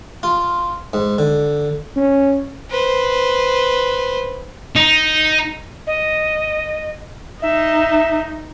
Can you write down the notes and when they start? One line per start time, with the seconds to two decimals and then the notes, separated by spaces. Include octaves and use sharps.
0.23 F4
0.93 G#2
1.18 D3
1.96 C#4
2.70 B4 C5
4.76 D#4
5.87 D#5
7.42 D#4 E5